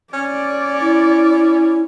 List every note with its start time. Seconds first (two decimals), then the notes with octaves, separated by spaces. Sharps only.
0.13 C#4 D5
0.81 E4